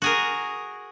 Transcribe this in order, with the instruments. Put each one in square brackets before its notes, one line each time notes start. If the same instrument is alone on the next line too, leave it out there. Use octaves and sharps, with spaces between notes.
[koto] F#4 G#4 A#4